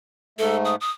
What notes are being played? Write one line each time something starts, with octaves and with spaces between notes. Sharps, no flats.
G#2 A3 A4
D#6
D#6